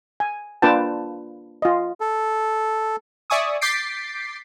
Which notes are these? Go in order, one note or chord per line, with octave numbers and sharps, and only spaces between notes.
G#5
A#3 D4 F4 B4 G5 A5
F4 D#5
A4
D5 E5 G#5 C#6 D#6
D6 G6 A6 B6 C7 D7